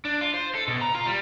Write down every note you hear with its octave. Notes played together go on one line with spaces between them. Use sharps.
D4
F4
C5
A4
B2
A#5
F4
G3